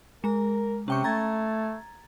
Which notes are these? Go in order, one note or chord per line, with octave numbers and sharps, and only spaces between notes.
G#3 A#4 A#5
C3 C#4 G5 C#6
A3 A#5 G#6 A6